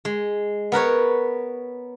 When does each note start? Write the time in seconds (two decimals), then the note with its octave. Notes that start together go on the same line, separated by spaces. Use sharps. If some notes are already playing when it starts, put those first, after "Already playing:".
0.05 G#3
0.72 B3 A#4 B4 C#5